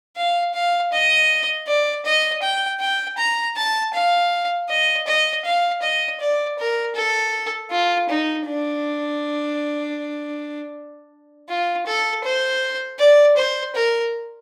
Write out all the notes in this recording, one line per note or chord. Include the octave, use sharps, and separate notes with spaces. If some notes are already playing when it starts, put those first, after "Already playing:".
F5
F5
D#5
D5
D#5
G5
G5
A#5
A5
F5
D#5
D#5
F5
D#5
D5
A#4
A4
F4
D#4
D4
F4
A4
C5
D5
C5
A#4